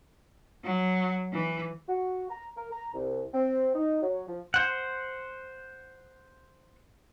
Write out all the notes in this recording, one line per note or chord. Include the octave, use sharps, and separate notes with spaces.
F#3
E3
F#4
A#5
A#4
A#5
C2
C4
D#4
F#3
F3
C5 F#5